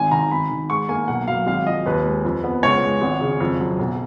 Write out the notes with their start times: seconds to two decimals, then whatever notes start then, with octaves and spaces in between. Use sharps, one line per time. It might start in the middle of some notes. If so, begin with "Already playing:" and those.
Already playing: G#1 D#3 G#5
0.12 D#3 A#5
0.31 G#1 B5
0.51 D#3
0.70 G#2 C#6
0.89 A#3 G#5
1.08 B1 F#5
1.28 F#3 F5
1.46 G#1 F5
1.66 F3 D#5
1.86 D#2 B4
2.06 G#3
2.25 F2
2.44 B3
2.63 C#2 C#5
2.83 G#3
3.02 G#1
3.21 C#3
3.40 F2
3.60 F#3
3.79 B1